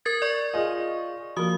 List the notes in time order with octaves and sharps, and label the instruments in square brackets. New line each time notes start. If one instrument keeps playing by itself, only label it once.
[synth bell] A#4 G#6 A6
D5 C#6
[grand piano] F4 G#4 D#5
[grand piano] F3 A#3 [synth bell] F#4 D#6